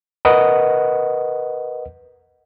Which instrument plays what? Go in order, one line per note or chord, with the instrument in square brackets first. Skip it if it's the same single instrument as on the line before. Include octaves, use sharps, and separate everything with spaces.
[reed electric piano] A#4 B4 D#5 F#5